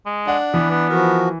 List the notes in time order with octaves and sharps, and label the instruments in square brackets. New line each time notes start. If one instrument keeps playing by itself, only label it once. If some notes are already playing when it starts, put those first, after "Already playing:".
[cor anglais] G#3
[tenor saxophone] D4 [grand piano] F#5
[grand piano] E3 [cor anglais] B3
[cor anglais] B3
[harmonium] F3 F#4 [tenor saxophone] A#4